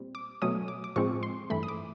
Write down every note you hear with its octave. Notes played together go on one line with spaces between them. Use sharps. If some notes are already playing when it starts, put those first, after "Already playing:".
Already playing: A#2 G3 C4
D6
B2 F#3 A3 C#4 D#6
D6
D6
A2 F3 G#3 C4 C#6
C6
G2 E3 A3 B5
D#6
D6